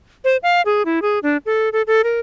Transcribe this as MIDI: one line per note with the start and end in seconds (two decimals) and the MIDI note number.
0.24 0.37 72
0.43 0.62 77
0.65 0.82 68
0.85 1.02 64
1.02 1.19 68
1.23 1.37 62
1.46 1.69 69
1.73 1.82 69
1.87 2.02 69
2.04 2.20 70